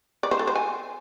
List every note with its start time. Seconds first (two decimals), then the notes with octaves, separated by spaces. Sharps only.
0.23 D5
0.31 C5
0.39 A4
0.47 C5
0.55 G#5